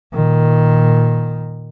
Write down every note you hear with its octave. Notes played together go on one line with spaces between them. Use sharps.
A#2 D#3